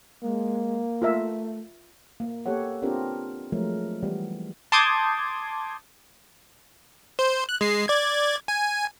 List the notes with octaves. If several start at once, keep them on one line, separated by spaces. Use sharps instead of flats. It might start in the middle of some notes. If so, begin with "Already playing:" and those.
G#3 A#3
A3 F4 A#4 E5
A#3
A#3 B3 G4 A4 C#5 F#5
B3 C4 D4 F4 G4 A#4
F3 F#3 G#3 A3 A#4
E3 G3 B3
A5 C6 D6 D#6 G6 G#6
C5
F#6
G#3 C7
D5 G#6
G#5